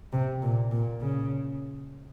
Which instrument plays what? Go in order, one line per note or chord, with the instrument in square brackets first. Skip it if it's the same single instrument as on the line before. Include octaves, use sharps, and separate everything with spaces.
[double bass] C3
A#2
A#2
C#3